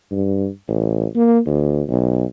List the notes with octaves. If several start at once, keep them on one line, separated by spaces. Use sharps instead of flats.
G2
A1
A#3
D2
B1